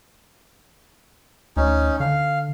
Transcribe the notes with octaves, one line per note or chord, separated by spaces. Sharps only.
D2 C#4 D#4
D3 F5